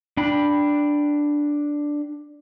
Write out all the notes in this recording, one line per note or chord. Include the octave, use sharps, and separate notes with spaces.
D4 G5 B5